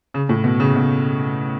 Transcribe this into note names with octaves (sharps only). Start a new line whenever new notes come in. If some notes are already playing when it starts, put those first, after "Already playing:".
C#3
A2
B2
C#3
B2